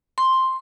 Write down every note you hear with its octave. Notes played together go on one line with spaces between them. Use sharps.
C6